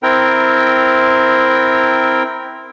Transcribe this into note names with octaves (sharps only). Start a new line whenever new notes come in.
C4 E4 A#4 G5